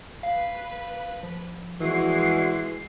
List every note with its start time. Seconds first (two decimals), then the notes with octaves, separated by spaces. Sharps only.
0.23 B4 F5
1.23 F3
1.80 E3 G#3 F#4 C7